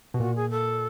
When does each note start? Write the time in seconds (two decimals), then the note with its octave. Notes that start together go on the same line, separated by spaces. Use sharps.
0.14 B2 G4
0.20 A#2 F#4
0.35 G#4
0.50 A4